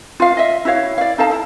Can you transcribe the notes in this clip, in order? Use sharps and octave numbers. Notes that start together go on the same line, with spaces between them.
F4 F5
D#5 E5
E4 F#4 C#5 F5
D5 F5
D#4 A4 F5 A5
E4